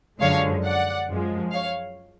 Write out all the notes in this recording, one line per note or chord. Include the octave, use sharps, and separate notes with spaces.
F#2 D3 F3 G#3 C#5 F5
D5 F#5
F#2 F3 G#3
C#5 F5